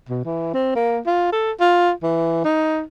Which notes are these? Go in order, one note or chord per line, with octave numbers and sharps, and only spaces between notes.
B2
E3
C4
A#3
F4
A4
F4
E3
D#4